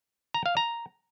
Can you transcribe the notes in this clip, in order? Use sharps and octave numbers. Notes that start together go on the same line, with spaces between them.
A#5
F5
A#5